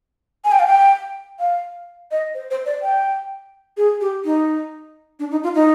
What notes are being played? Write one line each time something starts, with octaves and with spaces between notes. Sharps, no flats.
G#5
G5
F5
G5
F5
D#5
C5
C5
D5
G5
G#4
G4
D#4
D4
D#4
F4
D#4